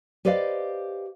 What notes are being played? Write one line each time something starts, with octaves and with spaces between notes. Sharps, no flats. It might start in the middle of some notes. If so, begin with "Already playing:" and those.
G4 B4 C5 D5 D#5 F5